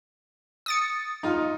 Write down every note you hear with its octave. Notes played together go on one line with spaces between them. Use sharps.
D#6 A6 C#7
D#4 F4